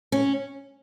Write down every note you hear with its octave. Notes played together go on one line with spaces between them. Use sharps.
C#4